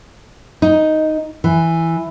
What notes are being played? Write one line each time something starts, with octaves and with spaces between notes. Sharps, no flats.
D#4
E3